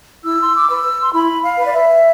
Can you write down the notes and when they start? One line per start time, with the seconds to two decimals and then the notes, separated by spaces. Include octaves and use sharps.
0.24 E4 E6
0.42 C6
0.56 D6
0.68 B4 E6
1.01 C6
1.13 E4 B5
1.42 F5
1.58 B4
1.66 D5
1.72 E5